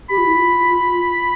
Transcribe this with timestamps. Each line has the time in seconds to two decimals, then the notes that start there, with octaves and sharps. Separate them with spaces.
0.10 G4 B5
0.18 F4
0.26 E4
0.36 F4